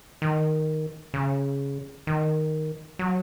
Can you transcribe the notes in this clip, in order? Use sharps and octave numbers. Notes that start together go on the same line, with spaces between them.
D#3
C#3
D#3
F#3